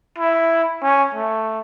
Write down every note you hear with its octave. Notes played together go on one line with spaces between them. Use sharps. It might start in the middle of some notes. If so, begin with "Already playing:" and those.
E4
C#4
A3